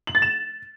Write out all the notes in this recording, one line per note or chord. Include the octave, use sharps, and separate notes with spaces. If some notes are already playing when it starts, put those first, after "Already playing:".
F#7
A6
E7